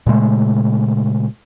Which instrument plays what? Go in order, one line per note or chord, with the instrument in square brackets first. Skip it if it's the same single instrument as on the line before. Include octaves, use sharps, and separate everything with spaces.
[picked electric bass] A#2 C#3 G#3 A3